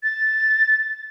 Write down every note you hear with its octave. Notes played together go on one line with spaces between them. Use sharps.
A6